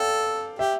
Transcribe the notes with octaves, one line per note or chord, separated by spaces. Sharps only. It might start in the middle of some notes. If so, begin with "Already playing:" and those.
Already playing: A4 D5 F5 G5
G4 E5